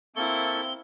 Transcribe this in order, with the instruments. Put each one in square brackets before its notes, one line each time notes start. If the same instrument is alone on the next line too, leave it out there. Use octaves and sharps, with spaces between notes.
[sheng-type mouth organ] A#3 A4 C#6 [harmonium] C4 [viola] E4 [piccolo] G7